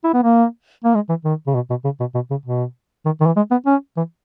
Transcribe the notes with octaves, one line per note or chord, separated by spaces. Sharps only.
E4
B3
A#3
A#3
G#3
E3
D#3
C#3
B2
B2
C#3
B2
B2
C#3
B2
D#3
D#3
E3
G#3
B3
C#4
E3